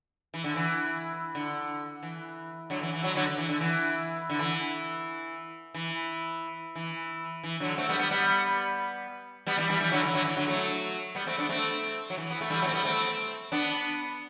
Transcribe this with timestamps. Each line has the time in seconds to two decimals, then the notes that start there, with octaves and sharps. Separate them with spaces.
0.34 E3
0.44 D3
0.56 E3
1.35 D3
2.03 E3
2.70 D3 F#3
2.82 E3
2.93 E3
3.03 D3 F#3
3.15 D3 F#3
3.38 E3
3.49 D3
3.61 E3
4.30 D3
4.39 E3
5.74 E3
6.76 E3
7.44 E3
7.60 D3 F#3
7.77 A3 C4
7.89 G3 B3
7.99 G3 B3
8.11 G3 B3
9.46 G3 B3
9.57 E3 G3
9.68 E3 G3
9.80 E3 G3
9.92 D3 F#3
10.03 E3
10.13 D3 F#3
10.25 E3
10.37 D3 F#3
10.48 F#3 A3
11.15 G3 B3
11.27 A3 C4
11.38 B3 D4
11.49 A3 C4
12.10 F#3
12.17 E3
12.30 B3
12.41 A3
12.50 E3 G3
12.62 F#3 A3
12.67 C4
12.73 G3 B3
12.84 A3 C4
13.52 B3 D4